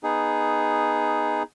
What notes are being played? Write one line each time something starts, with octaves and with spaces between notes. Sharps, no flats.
B3 D#4 G#4